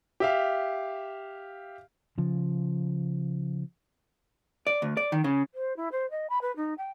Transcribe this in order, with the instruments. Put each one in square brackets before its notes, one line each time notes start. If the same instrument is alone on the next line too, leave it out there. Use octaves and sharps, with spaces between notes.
[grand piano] G4 E5 F5
[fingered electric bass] C#3 F3
[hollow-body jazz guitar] D5
D2
D5
D#3
C#3
[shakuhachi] C5
E4
C5
D#5
B5
B4
D#4
G5